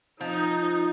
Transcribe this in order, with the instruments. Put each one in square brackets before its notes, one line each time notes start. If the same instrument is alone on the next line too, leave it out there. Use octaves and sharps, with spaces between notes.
[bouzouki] F3 [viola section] D#4